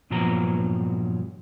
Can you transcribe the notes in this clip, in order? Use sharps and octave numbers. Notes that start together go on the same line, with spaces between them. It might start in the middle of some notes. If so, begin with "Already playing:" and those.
G2 A#2 F3 F#3 B3 A#5